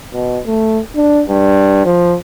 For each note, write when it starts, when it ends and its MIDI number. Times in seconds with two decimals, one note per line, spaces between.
0.13 0.40 47
0.46 0.80 57
0.95 1.22 62
1.29 1.84 43
1.85 2.16 53